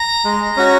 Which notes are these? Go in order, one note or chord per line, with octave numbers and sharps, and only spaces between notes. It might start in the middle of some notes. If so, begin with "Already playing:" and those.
Already playing: A#5
G#3
C#4 F#4